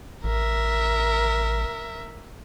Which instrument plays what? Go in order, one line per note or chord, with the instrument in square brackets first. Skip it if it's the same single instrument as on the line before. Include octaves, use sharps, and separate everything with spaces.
[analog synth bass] A1 [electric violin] A#4 E5